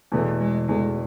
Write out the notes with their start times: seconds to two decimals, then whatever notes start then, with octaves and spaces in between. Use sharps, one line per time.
0.12 E2 B2 E3 A3
0.40 G#3
0.68 E2 B2 G#3 A3